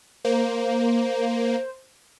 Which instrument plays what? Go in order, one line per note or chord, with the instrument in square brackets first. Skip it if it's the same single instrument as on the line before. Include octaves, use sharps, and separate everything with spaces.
[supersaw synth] A#3 [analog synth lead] C5